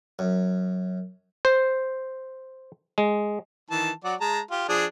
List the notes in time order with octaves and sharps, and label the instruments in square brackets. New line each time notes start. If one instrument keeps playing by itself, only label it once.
[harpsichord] F#2
[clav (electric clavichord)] C5
G#3
[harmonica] D#3 E3 A5
F#3 F#4 D5
G#3 A5 A#5
F4 G4
F3 D4 G#4